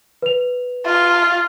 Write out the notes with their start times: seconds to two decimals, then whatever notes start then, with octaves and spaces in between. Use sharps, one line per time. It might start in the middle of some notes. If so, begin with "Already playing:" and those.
0.22 B4 F7
0.86 F4